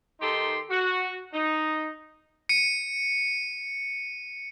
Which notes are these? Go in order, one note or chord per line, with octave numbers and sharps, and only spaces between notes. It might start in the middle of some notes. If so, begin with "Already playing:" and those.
D#3 D#4 G4 A4 C6
F#4
D#4
C#7 D#7